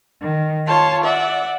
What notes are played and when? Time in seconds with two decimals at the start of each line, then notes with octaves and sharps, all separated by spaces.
0.21 D#3
0.66 F4 C#5 A5 C6
1.03 D5 E5 F#5